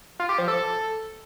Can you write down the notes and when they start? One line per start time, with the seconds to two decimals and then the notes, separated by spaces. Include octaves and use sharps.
0.20 F4
0.29 G4
0.38 F3
0.48 A4